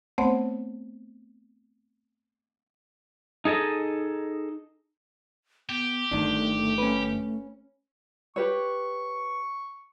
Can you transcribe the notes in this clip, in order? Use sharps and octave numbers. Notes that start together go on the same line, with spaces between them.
A3 B3 C4 C5 C#5 F#5
D#4 G#4 A4 D#5
B3 G4
G1 D#3 A3 D4
C#4 B4
G4 B4 C#5 C#6